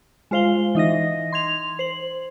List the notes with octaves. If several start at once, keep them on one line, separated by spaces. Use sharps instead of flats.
G#3 F4 C5 F5 G7
E3 D#4 D#5 A#6
C6 G#6 F7
C5 F#7